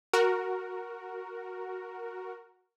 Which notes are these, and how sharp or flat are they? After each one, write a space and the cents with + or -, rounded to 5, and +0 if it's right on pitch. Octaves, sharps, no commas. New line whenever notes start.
F#4 +0 A#4 +0